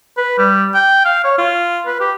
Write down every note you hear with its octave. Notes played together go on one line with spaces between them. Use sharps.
B4
G3
G5
F5
C#5
F4
B4
G4